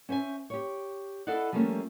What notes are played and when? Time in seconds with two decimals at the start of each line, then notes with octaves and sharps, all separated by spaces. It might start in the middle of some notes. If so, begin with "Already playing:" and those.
0.09 C#4 C5 E5 G#5
0.50 G4 C#5
1.27 E4 A4 D5 D#5 F5 F#5
1.52 F3 G3 A3 A#3 C#4